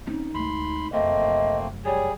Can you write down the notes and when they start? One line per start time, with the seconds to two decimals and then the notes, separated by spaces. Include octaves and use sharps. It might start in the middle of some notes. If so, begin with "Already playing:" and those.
0.07 C4 C#4 D#4
0.35 D2 G#3 B5 C6
0.92 F1 F#2 A3 A#3 C4 D#5
1.85 G3 G#4 C#5